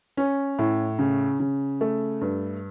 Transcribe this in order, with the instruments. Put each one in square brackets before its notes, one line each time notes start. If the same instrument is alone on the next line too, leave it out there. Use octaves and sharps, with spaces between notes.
[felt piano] C#4
A2
C#3
C#3
A3
G2